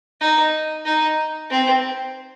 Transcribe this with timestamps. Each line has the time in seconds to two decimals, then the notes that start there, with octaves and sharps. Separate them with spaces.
0.21 D#4
0.85 D#4
1.50 C4